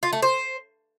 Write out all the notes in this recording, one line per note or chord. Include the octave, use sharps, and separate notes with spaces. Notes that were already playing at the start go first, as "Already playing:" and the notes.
F4
A3
C5